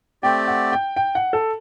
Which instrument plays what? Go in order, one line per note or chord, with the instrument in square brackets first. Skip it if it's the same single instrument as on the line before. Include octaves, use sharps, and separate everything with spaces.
[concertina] A3 C4 G4 D5 [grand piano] G5
[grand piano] F#5
G5
G5
F#5
A4